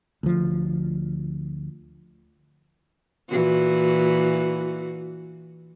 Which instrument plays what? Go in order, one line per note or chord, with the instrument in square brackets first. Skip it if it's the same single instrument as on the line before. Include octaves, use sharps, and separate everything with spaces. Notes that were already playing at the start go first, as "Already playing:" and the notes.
[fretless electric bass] D2 F3
[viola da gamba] A#2 E3 F#4